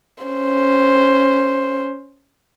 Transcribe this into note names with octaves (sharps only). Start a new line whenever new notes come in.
C#4 C5